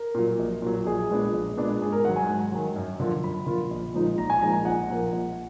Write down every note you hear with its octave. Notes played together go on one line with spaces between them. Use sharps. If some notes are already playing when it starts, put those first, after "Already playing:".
Already playing: A#4
A#2 F#3
A#1
A#2 F#3
A#1 G#4
A#2 G#3 B3 D4
A#1
A#2 G#3 B3 D4
G#2 G#4
A#4
D#3 F#3 F#5
G#5
G#2
D#3 F#3
F#2
D3 F3 A#3 F4
F#2 B5
D3 F3 A#3 F4
A#1
A#2 F3 G#3 D#4
A#1 A#5
G#5
A#2 F3 G#3 D#4 A#5
G#5
A#1 F#5
A#2 F3 A#3
A#1